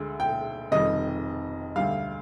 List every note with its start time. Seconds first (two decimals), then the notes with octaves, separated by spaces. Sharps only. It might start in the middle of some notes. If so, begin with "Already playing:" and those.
Already playing: D2 D3 G#3
0.20 G5
0.71 F1 F2 D#3 G3 D#5
1.76 D2 D3 G3 F5